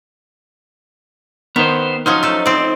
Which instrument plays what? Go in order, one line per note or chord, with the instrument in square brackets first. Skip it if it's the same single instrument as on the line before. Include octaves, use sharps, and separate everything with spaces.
[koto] D#3 [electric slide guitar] B3 C5
[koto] F3 F#3 C#4 [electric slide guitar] D#4
[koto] A3 A4
C4 D5